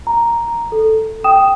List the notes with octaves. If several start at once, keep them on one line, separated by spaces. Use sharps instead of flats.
A#5
A4
G5 D#6 E7